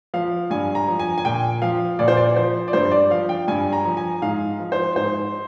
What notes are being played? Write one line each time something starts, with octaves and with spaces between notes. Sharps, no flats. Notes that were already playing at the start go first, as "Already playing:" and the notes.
F3 F5
G2 G#5
A#5
F3
G#5
G#5
A#2 G5
F3 F5
A#2 D5
C5
D5
F3 C5
D5
G2 C5
D5
F3 F5
G5
G2 G#5
A#5
F3
G#5
G#2 F5
F3
C5
G#2 C5